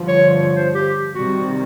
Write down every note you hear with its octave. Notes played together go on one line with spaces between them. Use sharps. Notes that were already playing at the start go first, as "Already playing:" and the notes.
Already playing: G2 D3 F3
C#5
C#5
C5
G4
C3 D#3 G3 F#4